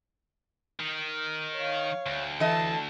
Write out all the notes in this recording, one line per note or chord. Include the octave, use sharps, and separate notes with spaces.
D#3
C#5 F5
D2
E3 A4 D#5 A5